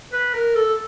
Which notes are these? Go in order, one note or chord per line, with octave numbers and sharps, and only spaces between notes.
B4
A#4
A4